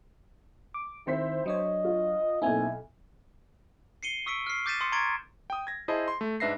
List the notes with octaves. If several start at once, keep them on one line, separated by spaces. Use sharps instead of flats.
D6
D#3 C4 E4 C5 B6
F#3 D4 C#5 D#5
F4
B1 A#3 C4 D#4 E4 G#5
C7 C#7 D#7 G7
C#6 D#6 E6 B6 C#7 D7
F6 C7
D6 G6 A6 B6 D#7 E7
C6 D#6 C#7
A#5 C6 C#6 G#6 A6 D7
G5 D#6
G#6 A#6
E4 G#4 C5 D#5 A5
C6
A3
G#2 D4 B4 E5 A#6 C7